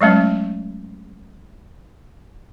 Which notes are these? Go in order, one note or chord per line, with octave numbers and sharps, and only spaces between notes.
F#3 G#3 A3 C#4